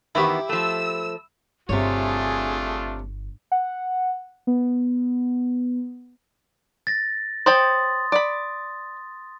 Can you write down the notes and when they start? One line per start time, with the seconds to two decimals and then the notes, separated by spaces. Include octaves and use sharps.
0.15 D#3 E3 B3 E4 G4 E5 B5
0.49 F3 A3 E6
1.69 G1 C3 A3 D4 F4 G#4 C#5
3.52 F#5
4.47 B3
6.87 A6 A#6
7.46 C5 C#5 G5 C6 D#6 A6
8.12 D5 B5